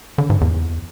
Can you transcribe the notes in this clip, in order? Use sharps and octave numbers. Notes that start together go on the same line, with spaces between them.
D3
G#2
E2